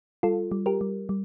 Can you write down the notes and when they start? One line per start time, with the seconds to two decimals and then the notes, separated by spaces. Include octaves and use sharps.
0.23 G3 F4 A4
0.52 G3
0.66 G4 A#4
0.81 G3
1.09 G3